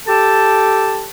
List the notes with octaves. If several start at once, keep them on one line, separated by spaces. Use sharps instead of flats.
G4 A4 A5